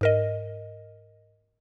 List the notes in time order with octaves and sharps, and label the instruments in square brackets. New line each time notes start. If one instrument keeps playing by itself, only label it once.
[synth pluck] G#2 A#4 D#5